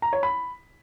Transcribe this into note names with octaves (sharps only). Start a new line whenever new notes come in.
A#5
C#5
B5